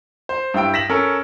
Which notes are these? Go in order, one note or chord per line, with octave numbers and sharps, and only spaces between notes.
C5
G2 E4 G5 D7
A#6 B6 E7 F#7
C#4 A4 A#4